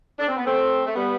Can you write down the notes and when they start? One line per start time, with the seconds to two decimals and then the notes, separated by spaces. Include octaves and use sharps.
0.19 D4
0.28 C4
0.37 B3
0.45 A3 C4
0.86 A3
0.95 G3 B3